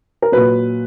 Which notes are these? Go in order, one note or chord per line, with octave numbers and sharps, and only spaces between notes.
A#4
A#2 F#3 B4